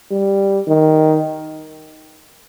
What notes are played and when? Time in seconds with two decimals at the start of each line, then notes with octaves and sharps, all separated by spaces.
0.11 G3
0.67 D#3